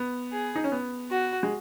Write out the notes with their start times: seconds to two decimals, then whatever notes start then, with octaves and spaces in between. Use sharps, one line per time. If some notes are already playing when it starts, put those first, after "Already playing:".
Already playing: B3
0.32 G#4
0.56 D#4
0.64 C#4
0.72 B3
1.11 F#4
1.43 G#3